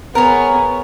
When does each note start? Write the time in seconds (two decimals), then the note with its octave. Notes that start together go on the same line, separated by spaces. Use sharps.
0.15 B3 G#4 A#4 C#5